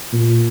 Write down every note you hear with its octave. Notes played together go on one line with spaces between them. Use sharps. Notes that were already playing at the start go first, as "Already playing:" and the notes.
A#2